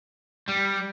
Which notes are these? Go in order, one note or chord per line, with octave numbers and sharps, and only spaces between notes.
G3